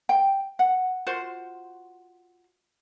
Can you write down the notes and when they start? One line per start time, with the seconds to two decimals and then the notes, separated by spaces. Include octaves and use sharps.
0.09 G5
0.59 F#5
1.07 F4 F#4 C5